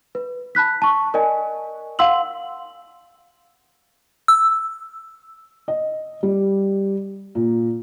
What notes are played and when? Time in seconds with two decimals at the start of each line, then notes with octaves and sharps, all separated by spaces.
0.15 B4
0.55 A5 B5 F#6 B6
0.82 A5 C#6
1.14 A#4 D5 D#5 G#5
1.99 F5 F#5 C6 E6 F#7
4.28 E6
5.68 D#5
6.23 G3
7.35 A#2